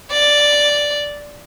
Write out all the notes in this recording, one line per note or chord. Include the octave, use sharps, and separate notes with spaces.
D5